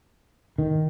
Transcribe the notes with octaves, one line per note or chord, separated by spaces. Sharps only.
D#3